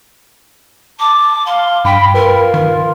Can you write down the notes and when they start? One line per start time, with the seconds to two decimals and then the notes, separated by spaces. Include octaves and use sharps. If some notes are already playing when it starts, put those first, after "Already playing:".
0.99 A5 D6
1.46 F5 C6
1.85 G2 G5 B5
2.14 F4 A#4 B4
2.54 D#3 A#4